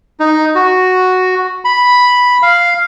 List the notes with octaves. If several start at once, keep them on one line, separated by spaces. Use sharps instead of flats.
D#4
F#4
B5
F5